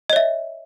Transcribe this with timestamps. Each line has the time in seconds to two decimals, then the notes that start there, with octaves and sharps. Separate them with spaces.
0.10 D#5
0.13 C#5
0.16 E5